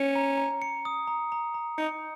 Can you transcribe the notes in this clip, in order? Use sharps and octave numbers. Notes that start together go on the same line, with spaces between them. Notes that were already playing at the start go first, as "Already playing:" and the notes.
Already playing: C#4 C#7
A#5
A#5
C#7
D#6
A#5
A#5
A#5
D#4 C#7